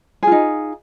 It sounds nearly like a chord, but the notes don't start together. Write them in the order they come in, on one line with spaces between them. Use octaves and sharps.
G#4 F4 D#4